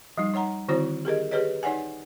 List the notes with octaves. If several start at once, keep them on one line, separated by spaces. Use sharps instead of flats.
F3 G3 D#4
D#4 C#5 F#5 A#5
D3 D#3 C4 E4 F#4 C5
G4 G#4 A#4 D#5
G4 G#4 B4 C#5 D#5
D#4 C#5 D5 F#5 G#5